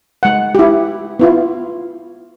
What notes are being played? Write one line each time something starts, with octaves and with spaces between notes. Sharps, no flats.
G#3 F#5
E4 G4
B3 E4 F4